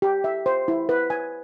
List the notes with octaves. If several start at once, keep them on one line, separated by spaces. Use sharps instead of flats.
G4
E5
C5
E4
B4
G#5